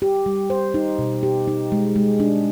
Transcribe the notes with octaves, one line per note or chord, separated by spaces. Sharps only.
G4
G3
C5
D#4
B2
G4
D#4
G#3
G#3
D4